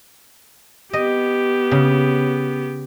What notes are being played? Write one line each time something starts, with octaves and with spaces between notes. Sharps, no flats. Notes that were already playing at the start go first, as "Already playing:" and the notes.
B3 G4 D#5
C#3